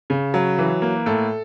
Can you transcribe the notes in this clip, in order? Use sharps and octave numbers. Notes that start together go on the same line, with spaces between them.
C#3
F#3
E3
A#3
A2 A4